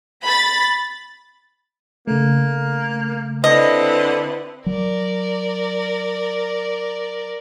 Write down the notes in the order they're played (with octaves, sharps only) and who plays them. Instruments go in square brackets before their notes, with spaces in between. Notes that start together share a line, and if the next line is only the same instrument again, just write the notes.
[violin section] B5 A6
[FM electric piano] C#3 A3 [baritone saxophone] A#3
[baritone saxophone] D3 [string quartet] C4 E4 B4 [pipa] D#5
[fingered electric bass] F#3 [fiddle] A#4 D5